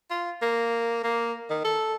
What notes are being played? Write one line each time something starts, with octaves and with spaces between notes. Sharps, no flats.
F4
A#3
A#3
D#3
A4